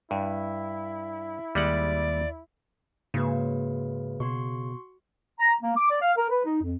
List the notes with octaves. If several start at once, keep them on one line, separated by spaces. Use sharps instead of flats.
G2 E4
D#2 G3 G#3 D5 F#5
G#2 C#3 A#3 F#4 B4
B2 F#4 C6 C#6
A#5
A#3
D6
D5
F5
A#4
B4
D#4
F2